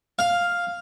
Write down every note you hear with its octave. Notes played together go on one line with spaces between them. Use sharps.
F5